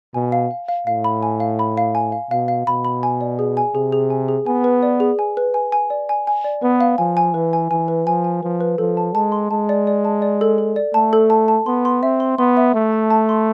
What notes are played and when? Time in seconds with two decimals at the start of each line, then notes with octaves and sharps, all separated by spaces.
0.14 B2 G#5
0.32 F5
0.51 F5
0.69 F5
0.87 A2 F5
1.04 B5
1.23 G#5
1.40 F5
1.59 B5
1.77 F5
1.95 G#5
2.12 F5
2.31 B2 F5
2.48 F5
2.67 B2 B5
2.85 B5
3.03 G#5
3.21 D5
3.39 G#4
3.57 G#5
3.75 C3 G#4
3.92 G#4
4.10 G#5
4.29 G#4
4.46 B3 G#5
4.64 B4
4.83 D5
5.00 G#4
5.19 G#5
5.37 B4
5.54 G#5
5.72 G#5
5.90 D5
6.09 G#5
6.27 G#5
6.44 D5
6.62 B3 B4
6.81 F5
6.98 F3 G#5
7.17 G#5
7.34 E3 B4
7.53 G#5
7.71 E3 G#5
7.88 B4
8.07 F3 G#5
8.24 G#5
8.43 F3 B4
8.61 B4
8.78 F3 A4
8.97 A5
9.14 G#3 A5
9.32 C6
9.51 G#3 A5
9.69 D5
9.87 D5
10.05 A5
10.22 D5
10.41 A4
10.58 A4
10.76 D5
10.94 A3 A5
11.13 A4
11.30 A5
11.48 A5
11.66 B3 C6
11.85 C6
12.02 C4 E5
12.20 C6
12.38 B3 C6
12.57 E5
12.74 A3 E5
12.92 A5
13.10 A5
13.29 C6